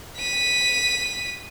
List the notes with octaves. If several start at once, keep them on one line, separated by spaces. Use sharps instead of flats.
B6 D#7